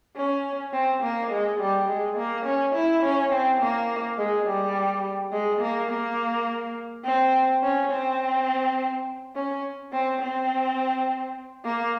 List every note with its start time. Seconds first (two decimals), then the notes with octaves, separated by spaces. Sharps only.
0.17 C#4
0.73 C4
1.03 A#3
1.31 G#3
1.60 G3
1.89 G#3
2.17 A#3
2.46 C#4
2.75 E4
3.03 C#4
3.32 C4
3.60 A#3
4.18 G#3
4.47 G3
5.32 G#3
5.61 A#3
5.90 A#3
7.05 C4
7.63 C#4
7.91 C4
9.35 C#4
9.93 C4
10.21 C4
11.65 A#3